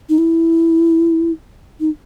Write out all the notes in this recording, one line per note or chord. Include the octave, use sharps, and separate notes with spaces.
D#4
E4
D#4